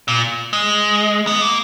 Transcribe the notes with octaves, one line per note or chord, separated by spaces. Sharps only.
A#2
G#3
B3
A#3